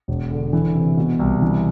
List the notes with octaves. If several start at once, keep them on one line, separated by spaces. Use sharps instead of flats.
E1
D3
E3
C3
B2
C2
E3